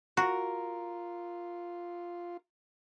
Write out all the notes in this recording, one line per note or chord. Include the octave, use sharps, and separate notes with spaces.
F4 F#4 A#4